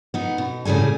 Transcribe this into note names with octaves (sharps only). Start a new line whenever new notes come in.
B3 D#4
B2
A2 C#3 G3 G#4 G#5